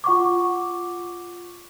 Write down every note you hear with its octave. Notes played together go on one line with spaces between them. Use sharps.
F4 F#5 C#6 D6